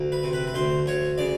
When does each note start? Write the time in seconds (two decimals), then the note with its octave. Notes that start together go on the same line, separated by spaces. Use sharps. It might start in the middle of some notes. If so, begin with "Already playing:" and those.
Already playing: D2
0.12 B4
0.23 C3
0.33 B4
0.47 B4
0.54 D2 C5
0.86 D2 C#5
1.18 C#3 D5